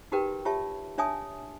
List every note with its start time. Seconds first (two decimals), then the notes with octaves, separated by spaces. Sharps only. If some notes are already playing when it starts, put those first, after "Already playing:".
0.12 D#4 F#4 G4 A#4 B4 G5
0.45 F4 G4 C#5 E5 A5
0.98 D4 C#5 E5 G#5 A5 D#6